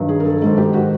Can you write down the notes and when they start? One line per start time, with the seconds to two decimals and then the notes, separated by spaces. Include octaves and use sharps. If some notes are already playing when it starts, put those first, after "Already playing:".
Already playing: G2 D#3 F#3
0.09 G#4
0.20 A#4
0.25 A4
0.41 G#2 D#3 G#3 A4
0.58 G4
0.74 F#4